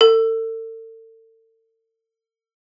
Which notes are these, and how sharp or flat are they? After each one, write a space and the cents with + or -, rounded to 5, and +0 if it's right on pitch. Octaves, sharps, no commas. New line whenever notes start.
A4 +40